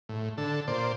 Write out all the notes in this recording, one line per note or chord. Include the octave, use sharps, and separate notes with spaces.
A2
D3 A4
A#2 C5 D5